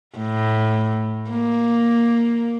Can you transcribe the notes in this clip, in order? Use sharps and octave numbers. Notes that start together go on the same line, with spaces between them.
A2
A#3